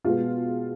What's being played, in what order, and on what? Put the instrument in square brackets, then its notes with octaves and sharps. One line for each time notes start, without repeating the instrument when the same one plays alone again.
[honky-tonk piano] B2 G#3 B3 F4